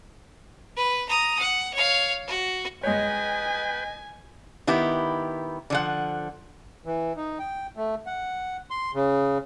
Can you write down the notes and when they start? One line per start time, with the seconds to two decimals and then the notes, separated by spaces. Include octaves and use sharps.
0.76 B4
1.09 A#5 D#6
1.39 F#5
1.73 C#5 F5
2.27 F#4
2.83 G#3 B4 C#5 D#5 G5 G#5
4.67 D#3 B3 E4 G4
5.70 D3 F3 F#5
6.85 E3
7.17 D#4
7.39 G5
7.77 A3
8.06 F#5
8.71 C6
8.94 C#3